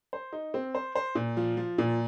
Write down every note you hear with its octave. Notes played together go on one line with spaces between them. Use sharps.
C5
D#4
C4
C5
C5
A#2
F3
F3
A#2